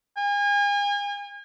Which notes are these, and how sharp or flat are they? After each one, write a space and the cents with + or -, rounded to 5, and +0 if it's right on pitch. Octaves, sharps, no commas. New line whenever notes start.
G#5 -35